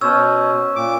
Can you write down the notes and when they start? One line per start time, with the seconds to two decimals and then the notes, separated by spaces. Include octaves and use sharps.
0.01 B2 C#4 C5 D#5 E6
0.76 A#2 D6